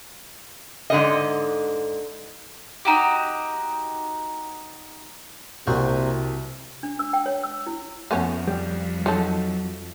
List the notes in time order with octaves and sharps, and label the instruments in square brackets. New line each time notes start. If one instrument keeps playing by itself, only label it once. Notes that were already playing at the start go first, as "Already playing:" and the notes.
[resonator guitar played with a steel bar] G#2 D3 D#5
[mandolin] D#4 F#4 G4
[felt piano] C2 [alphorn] C3 [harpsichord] A#3 F#4 C5
[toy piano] D4
E6
G5
C#5
E6
E4
[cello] F2 F3 [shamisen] A3 B3 C#4
[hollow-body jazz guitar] G3
[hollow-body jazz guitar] F#3 [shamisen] D#4 A4